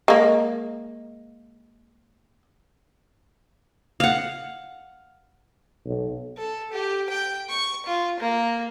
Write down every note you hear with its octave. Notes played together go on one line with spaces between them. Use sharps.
G#3 A#3
F5 F#5
B1
A4
G4
G5
C#6
F4
A#3